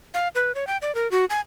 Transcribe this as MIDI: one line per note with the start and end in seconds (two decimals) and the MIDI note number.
0.14 0.28 77
0.35 0.54 71
0.55 0.67 73
0.67 0.77 79
0.82 0.94 74
0.95 1.10 70
1.11 1.25 66
1.30 1.40 80